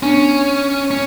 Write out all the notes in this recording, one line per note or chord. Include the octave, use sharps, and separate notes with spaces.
B3 C#4 D4
C#4